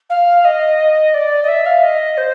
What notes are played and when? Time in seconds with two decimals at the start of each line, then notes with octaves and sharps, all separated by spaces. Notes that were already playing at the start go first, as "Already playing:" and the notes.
0.09 F5
0.44 D#5
1.14 D5
1.42 D#5
1.48 E5
1.65 F5
1.82 D#5
2.17 C5